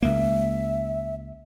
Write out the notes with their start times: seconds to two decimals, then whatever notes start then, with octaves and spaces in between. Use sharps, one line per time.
0.02 C#2 A#3 E5